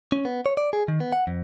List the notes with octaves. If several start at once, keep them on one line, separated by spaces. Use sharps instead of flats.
C#4
B3
C#5
D5
G#4
D#3
B3
F#5
F2